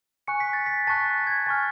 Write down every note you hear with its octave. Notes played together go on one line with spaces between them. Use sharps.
G#5 C#6 F#6 C#7
B6
A6
B6
A5 C#6 F#6 A6
A6
G#6
G#5 C#6 F6 A6